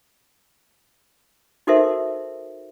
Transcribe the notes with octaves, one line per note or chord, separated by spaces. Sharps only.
D#4 F#4 A4 A#4 C5 E5